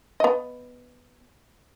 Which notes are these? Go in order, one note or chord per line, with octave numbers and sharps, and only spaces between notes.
B3 D#5